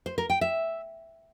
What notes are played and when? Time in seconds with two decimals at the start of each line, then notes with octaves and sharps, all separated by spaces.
0.06 C5
0.18 A#4
0.30 G5
0.41 E5